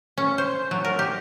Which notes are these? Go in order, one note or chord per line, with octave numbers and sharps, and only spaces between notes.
C#4
C5
F#3
A#4
G4